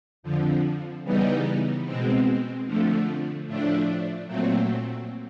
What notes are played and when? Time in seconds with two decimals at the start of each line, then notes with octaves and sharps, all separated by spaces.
0.23 F2 D3 F3
1.04 C#3 E3 G3 B3 D#4
1.85 B2 G#3 C4
2.65 F2 D3 F3 A3
3.47 A2 F3 A3 D4
4.27 A#2 F#3 A3 C4